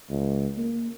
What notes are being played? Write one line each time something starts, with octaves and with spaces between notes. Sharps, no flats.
C#2
A#3